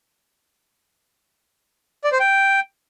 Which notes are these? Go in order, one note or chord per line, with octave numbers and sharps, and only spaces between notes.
D5
C5
G5